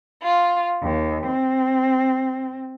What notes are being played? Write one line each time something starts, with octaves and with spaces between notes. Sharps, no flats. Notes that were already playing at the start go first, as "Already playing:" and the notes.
F4
D#2
C4